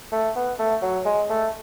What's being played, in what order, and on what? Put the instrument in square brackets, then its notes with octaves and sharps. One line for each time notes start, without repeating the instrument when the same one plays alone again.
[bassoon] A3
B3
A3
F#3
G#3
A3